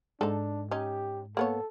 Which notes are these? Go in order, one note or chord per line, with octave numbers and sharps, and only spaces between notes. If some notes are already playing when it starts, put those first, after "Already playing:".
G#2 D4 D#4 A4
C#4 D#4 G4
A#3 B3 A4 C#5